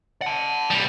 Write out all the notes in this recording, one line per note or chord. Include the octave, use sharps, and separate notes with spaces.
F#5 A5
B1 G3